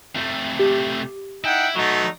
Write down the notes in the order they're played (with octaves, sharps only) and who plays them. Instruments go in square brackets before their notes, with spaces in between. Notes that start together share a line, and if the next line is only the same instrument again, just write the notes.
[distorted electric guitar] C3 A3
[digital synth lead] G4
[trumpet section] D#4 F#5 G5 [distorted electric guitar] E4 [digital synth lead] D7
[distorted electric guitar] F#3 B3 [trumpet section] A3 D#4 F#4